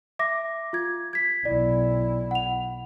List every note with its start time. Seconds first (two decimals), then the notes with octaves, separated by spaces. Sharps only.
0.19 E5 D6 A#6
0.73 F4 G#6
1.13 G#6 B6
1.45 B1 E4 D5
2.31 F#5 F7